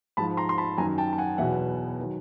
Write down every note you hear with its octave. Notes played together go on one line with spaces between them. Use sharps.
G#2 F3 A5 B5
A#5 C6
C6
A5 B5
F#2 D#3 F#3 G#5 A#5
G5 A5
A5
F#5 G#5
E2 B2 F#3 E5 F#5
D#3 F#3